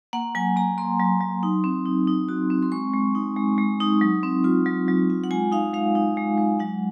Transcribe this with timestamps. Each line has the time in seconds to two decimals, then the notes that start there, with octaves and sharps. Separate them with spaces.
0.13 A#3 F#5
0.35 F#3 G#5
0.56 A#3 A#5
0.78 A#3 C6
1.00 F#3
1.21 F#3
1.43 D#4
1.64 C4
1.86 D#4
2.07 D#4
2.29 F#4
2.50 C4
2.63 C6
2.72 G#3 C#6
2.94 G#3
3.15 D#4
3.36 G#3
3.58 G#3
3.80 D#4
4.01 F#3
4.23 C4
4.44 F4
4.66 F#3
4.88 F#3
5.10 F4
5.24 F#5
5.31 G#3 G#5
5.52 D#4 F5
5.73 G#3 F5
5.95 D#4
6.17 G#3
6.38 G#3
6.60 F#3 F#5